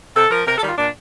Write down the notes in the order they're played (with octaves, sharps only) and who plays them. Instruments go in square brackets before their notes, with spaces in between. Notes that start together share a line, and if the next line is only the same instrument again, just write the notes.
[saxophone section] C3 A4
F3 A#4
C3 A#4
A4
D#3 G3 F4
A#2 D4